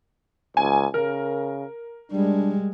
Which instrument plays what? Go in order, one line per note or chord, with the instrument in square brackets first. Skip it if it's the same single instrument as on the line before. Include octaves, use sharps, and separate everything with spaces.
[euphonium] C#2 [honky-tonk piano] G#5
[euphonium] C#3 [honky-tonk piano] A#4
[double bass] G3 G#3 [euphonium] D4